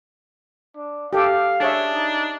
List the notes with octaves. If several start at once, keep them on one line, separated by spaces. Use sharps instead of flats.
D4
G4 A4 F5
D4 G#4 C#5 E5
D#4